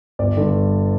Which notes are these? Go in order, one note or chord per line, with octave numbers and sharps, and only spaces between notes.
G1 D5
G2 D3